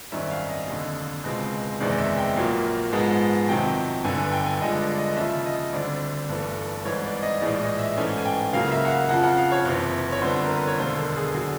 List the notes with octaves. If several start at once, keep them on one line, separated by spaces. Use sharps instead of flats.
G#1 F#2 D#3 G3 E5
F5
D#5
F1 D#2 D3
C#2 B2 G#3 C4
F#1 E2 C3 D#3 G#3 D5
E5
G5
A#1 A#2 F#3 A#3
G#2 F3 G#3 B3
F2 C3 D#3 F#3 G5
G1 G2 D3 G#5
G#5
G5
G#5
G2 D3 F3 G#3 D#5
D5
D#5
D#5
D#2 C#3 F3 E5
D#5
D2 D3 G3 C4 D5
G1 G2 E3 A3
G#1 G#2 E3 G3 C#5
D5
D#5
A#1 A2 E3 G#3 D5
D#5
E5
G#2 E3 A3 C#4 G#5
G#5
G5
C#2 C#3 F#3 A#3 F5
E5
F#5
F5
F2 C#3 F3 F#5
F#5
F5
C#5
F#1 F2 C3 E3
C#5
F2 D3 G3 B3 C5
A#4
B4
C#5
E1 D#2 D3 G3 A#3 C5
A4
G#4
D3 F#3